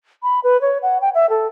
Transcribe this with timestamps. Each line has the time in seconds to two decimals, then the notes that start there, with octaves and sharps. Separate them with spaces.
0.23 B5
0.44 B4
0.61 C#5
0.83 F#5
1.01 G5
1.15 E5
1.30 A4